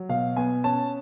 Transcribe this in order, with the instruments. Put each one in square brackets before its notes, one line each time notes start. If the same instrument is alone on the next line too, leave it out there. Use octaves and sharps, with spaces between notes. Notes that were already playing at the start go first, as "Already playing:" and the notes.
Already playing: [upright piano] F#3
B2 F5
B3 G#5
C#4 A5